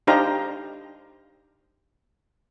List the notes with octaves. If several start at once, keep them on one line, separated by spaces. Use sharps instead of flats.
D4 D#4 G4 C5 F5 A#5